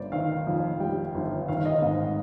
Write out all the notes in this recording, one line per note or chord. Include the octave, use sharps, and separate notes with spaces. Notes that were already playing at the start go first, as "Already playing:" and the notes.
Already playing: G1 C5 D5
D#3 F5
F2
G3 G5
G1
D#3 F5
D#5
G#2